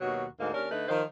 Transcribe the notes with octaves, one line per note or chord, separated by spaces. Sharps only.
D#2 B2 F#3 F#4
D2 G#2 A#3
D#2 C#4 D4 A#4
D3 A3 D#4 B4
D#3 F3